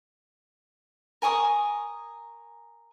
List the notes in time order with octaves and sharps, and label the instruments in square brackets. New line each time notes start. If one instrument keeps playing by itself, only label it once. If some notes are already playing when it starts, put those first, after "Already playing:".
[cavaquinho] A#4 G#5 C#6 D#6